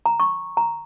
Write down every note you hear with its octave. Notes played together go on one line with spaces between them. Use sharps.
A#5
C#6
A#5